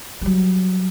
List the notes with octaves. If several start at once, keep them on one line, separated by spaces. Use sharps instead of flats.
F#3 G3